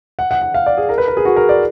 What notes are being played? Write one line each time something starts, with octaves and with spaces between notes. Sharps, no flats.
F#5
F#5
F#5
F5
D5
G#4
A#4
B4
A#4
G#4
F#4
A#4
D5